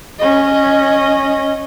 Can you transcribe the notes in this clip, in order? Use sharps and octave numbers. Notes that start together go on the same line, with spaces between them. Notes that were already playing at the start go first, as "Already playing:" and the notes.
C#4 D#5